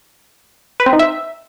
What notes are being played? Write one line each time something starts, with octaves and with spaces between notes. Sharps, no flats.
B4
C4
D#4
E5